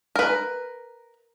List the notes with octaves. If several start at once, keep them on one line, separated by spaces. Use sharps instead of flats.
A#4 B4